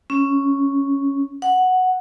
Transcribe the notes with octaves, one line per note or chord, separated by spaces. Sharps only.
C#4
F#5